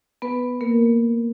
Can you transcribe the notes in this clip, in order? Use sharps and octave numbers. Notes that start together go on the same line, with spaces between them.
B3 B4
A#3 A#4